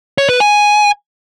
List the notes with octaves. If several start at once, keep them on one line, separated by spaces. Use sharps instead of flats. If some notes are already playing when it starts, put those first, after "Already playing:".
C#5
B4
G#5